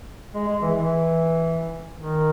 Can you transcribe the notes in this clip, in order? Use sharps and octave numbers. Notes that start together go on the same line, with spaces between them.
G#3
G#3
E3
E3
D#3